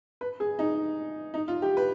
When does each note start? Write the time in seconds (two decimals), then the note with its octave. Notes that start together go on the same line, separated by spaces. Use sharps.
0.21 B4
0.40 G#4
0.59 D#4
1.34 D#4
1.48 F4
1.62 G4
1.77 B4